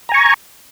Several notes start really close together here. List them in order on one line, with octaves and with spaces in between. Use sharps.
A#5 G#5 C#6